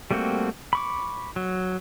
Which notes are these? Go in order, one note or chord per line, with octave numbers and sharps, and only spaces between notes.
G3 A3 A#3 C4 F#4
B5 C#6 D6
F#3